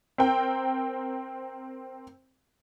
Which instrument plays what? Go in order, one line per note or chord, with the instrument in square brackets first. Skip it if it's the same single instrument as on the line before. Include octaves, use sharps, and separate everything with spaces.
[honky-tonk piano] C4 A#4 G5